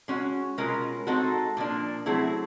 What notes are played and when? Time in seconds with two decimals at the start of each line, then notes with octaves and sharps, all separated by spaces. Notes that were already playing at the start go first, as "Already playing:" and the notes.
0.08 G#3 C#4 F#4
0.58 B2 G#3 C#4 F4 A#4
1.07 G#3 C4 D#4 F#4 A4
1.57 A#2 F3 A#3 D4
2.06 F#3 A3 C4 E4 G#4